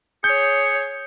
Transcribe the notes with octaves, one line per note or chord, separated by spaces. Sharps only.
G#4 C#5 G6 C#7